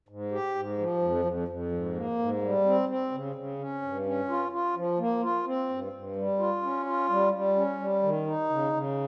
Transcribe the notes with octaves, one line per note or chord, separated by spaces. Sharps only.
G#2
G4
G#2
F3
F2
F2
F2
G#2
A#3
G#2
G3
C4
C4
C#3
C#3
C#4
G2
C#4
F4
F4
F3
A#3
F4
C4
G2
G2
G3
F4
C#4
F4
G3
G3
C#4
G3
D#3
D#4
C#3
C#3